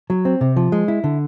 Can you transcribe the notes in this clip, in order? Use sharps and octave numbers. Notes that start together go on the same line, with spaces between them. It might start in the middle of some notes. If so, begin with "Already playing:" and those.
F#3
C4
C3
F3
G#3
E4
D3